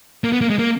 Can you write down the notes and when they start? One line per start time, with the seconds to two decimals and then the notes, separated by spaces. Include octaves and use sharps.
0.24 A#3
0.33 B3
0.41 A#3
0.50 G#3
0.59 A#3